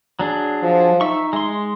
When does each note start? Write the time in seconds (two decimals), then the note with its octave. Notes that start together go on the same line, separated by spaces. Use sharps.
0.19 F#3 D4 G#4
0.63 F3
1.01 D#4 E5 C#6
1.33 G#3 C6